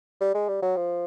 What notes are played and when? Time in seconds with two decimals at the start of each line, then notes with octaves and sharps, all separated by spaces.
0.21 G3
0.34 G#3
0.48 G3
0.62 F#3
0.76 F3